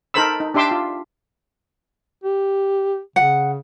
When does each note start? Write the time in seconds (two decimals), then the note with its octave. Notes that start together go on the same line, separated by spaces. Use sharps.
0.14 D#4 A4 A#4 C5 B5 E6
0.40 D#4
0.54 D4 G4 E5 C6 D6 E6
0.71 F4
2.24 G4
3.16 C#3 F#5